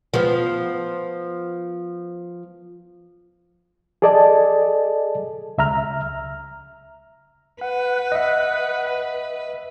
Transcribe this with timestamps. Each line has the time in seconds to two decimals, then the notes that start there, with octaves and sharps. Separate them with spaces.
0.14 F3 B3
4.02 G#4 A4 D5 D#5 G#5 A5
5.58 C#2 E5 A#5 F6
7.61 B4 F#5
8.12 D#5 E5